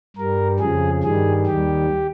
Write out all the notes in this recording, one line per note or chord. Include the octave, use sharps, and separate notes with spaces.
G2 G3 A#4
F2 C#3 F3 G#4
G2 D#3 G3 G#4
D#2 D#3 G3 G4